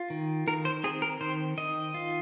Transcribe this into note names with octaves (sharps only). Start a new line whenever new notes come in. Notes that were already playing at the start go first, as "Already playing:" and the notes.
Already playing: F4
D#3
D#3 A#4
C5
C4 G#4
A#4
D#3 C5
D#3 D#5
F4